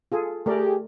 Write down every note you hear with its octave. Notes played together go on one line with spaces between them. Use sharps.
F4 G#4 A4
A3 G4 G#4 A#4 D5